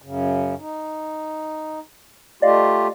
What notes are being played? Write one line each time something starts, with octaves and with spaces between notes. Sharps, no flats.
F#2 C#3
D#4
A3 F4 G4 D5 D#5 F5